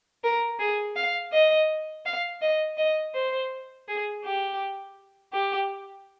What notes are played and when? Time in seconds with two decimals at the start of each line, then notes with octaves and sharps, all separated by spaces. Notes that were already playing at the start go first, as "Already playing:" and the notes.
0.24 A#4
0.59 G#4
0.96 F5
1.32 D#5
2.05 F5
2.41 D#5
2.78 D#5
3.14 C5
3.88 G#4
4.24 G4
5.33 G4